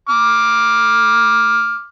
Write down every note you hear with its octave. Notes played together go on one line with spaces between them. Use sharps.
D6 F6